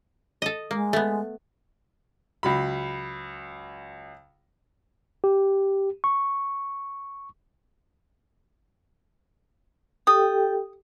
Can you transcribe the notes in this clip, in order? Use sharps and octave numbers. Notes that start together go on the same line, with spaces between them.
A4 D#5
G#3 A#3
A3 B3
C#2 F#3 B5
G4
C#6
G4 A4 G5 D#6